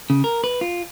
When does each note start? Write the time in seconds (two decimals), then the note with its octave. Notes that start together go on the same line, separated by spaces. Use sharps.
0.10 C#3
0.24 A#4
0.44 B4
0.61 F4